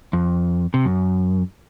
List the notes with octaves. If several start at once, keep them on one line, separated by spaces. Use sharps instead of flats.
F2
C3
F#2